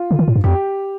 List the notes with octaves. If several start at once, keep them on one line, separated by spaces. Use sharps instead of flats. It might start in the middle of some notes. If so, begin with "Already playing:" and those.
Already playing: F4
D3
D#3
A2
G2
F2 G4